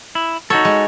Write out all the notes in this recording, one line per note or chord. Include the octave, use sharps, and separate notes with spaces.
E4
D#4 F#4 A4 C#5
G#3